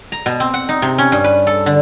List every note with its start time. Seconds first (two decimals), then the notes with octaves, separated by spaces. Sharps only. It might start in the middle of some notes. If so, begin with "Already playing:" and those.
0.12 A#5
0.26 B2
0.40 C4
0.54 F#5
0.69 D#4
0.82 C3
0.98 C#4
1.12 G2
1.24 B4
1.47 A4
1.66 D3